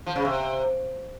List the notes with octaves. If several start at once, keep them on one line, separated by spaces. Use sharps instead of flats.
F3
C#3
C3